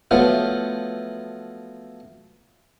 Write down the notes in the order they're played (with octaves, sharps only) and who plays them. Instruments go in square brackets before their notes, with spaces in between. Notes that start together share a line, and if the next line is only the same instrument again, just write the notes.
[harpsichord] F3 F#3 A3 B3 F4